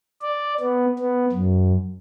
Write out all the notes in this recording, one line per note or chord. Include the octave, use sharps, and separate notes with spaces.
D5
B3
B3
F#2